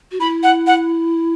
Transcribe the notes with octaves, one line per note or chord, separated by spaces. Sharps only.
F#4
E4 B5
F#5
F#5